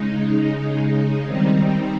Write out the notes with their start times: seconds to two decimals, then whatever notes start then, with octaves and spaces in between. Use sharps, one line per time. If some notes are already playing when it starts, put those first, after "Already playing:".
Already playing: C#3 G#3 D#4
1.26 D#3 G3 C4 D#4